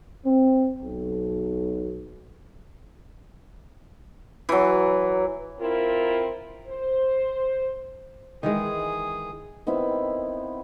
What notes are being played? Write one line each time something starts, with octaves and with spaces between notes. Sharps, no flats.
C4
B1
E3 F#3
C4 E4 F4 A#4
C5
D#3 E3 G#3 G#4
D#3 B3 C4 E4